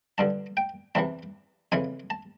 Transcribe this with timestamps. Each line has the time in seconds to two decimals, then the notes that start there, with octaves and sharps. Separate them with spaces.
0.18 G2 D3 A5
0.57 G5
0.95 E2 C3 E3 A5
1.72 F2 C#3 E3 G#5
2.10 A5